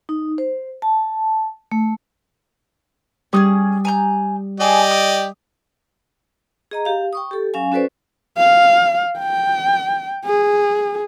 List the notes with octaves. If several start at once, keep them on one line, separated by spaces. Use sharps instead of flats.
D#4
C5
A5
A3
G3 C#4 F#4 G#4 D#6
G#5 A#5 G6
G4 G#4 D5 D#5 G#5 A5
D#6
G#4 D#5 A#5
G4 F5
G5 C#6 D#6
G4 A4
F#3 C#4 F5 G#5
C#4 F#4 A4 B4 C5 D5
F5
G5
G#4